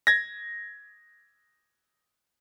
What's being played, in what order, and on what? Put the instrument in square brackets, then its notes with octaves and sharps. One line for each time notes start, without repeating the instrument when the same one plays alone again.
[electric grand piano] G#6 A#6